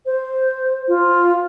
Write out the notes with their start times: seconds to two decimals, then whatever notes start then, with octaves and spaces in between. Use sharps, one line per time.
0.06 C5
0.88 F4